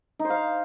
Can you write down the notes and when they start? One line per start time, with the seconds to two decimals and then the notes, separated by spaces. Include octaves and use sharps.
0.19 D#4
0.25 C5
0.30 F5